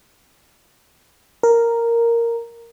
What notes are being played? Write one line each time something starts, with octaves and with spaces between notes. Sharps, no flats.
A#4